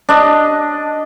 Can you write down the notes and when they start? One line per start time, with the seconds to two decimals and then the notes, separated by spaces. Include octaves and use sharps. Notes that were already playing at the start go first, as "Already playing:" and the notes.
0.09 D4 D#5